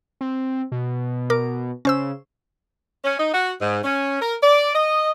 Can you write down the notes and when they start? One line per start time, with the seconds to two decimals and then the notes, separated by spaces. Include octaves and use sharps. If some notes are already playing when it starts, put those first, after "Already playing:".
0.21 C4
0.72 B2
1.30 A#4 D6
1.85 C#3 C#4 C5 E6
3.04 C#4
3.19 D#4
3.34 F#4
3.60 G#2
3.84 C#4
4.20 A#4
4.42 D5
4.75 D#5